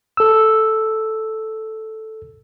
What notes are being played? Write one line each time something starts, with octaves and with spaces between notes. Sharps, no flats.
A4 E6